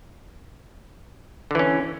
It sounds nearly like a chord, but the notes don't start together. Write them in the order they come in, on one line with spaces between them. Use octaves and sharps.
D3 E3 C#4